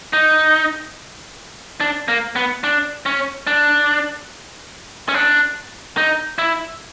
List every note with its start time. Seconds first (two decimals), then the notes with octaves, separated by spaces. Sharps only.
0.13 D#4
1.80 D4
2.08 A#3
2.36 B3
2.64 D4
3.06 C#4
3.47 D4
5.09 C#4
5.14 D4
5.97 D#4
6.38 E4